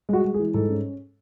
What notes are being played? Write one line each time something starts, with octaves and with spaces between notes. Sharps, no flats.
G#3 F#4
G#3
G#4
E3
G#2 A4
C#4